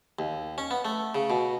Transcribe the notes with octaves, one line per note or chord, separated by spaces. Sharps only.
D#2
C#4
B3
A3
C#3
B2